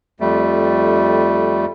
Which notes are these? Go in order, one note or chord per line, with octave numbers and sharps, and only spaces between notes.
F2 G3 A3